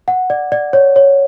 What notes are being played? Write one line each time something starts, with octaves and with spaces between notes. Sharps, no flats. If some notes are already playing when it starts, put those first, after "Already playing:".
F#5
D5
D5
C#5
C#5